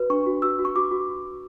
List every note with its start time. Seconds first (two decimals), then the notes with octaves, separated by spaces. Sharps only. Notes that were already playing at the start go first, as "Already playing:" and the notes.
Already playing: F#4 B4
0.10 D4 C#6
0.26 F#4
0.42 F#4 E6
0.59 F#4
0.65 C#6
0.76 F#4 D6
0.91 F#4